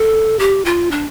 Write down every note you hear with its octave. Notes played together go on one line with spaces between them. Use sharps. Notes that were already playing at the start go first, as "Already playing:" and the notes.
Already playing: A4
G4
F4
D4